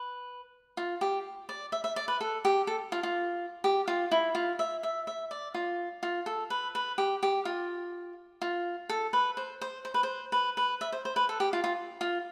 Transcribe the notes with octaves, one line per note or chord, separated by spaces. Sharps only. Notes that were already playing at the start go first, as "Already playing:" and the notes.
Already playing: B4
F4
G4
D5
E5
E5
D5
B4
A4
G4
A4
F4
F4
G4
F4
E4
F4
E5
E5
E5
D5
F4
F4
A4
B4
B4
G4
G4
F4
F4
A4
B4
C5
C5
C5
B4
C5
B4
B4
E5
C5
C5
B4
A4
G4
F4
F4
F4